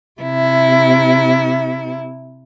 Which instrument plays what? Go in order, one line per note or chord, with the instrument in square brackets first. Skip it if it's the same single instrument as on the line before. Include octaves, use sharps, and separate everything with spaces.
[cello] C3 E4